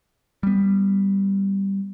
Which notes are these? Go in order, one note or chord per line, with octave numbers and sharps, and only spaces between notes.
G3 B3